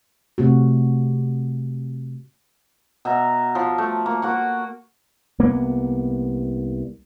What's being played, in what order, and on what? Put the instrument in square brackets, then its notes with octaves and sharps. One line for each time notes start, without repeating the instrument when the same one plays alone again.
[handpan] C3 A3 F#4
[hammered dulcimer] B2 E5 A#5
F3
A3
A#3
A#3 F#4 F#5
[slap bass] C2 A#3 B3